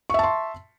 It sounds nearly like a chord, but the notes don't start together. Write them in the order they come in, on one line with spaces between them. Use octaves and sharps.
C#6 E5 A5 C6